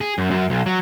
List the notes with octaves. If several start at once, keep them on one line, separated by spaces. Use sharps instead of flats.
G#4
F#2
F#2
B1
F#3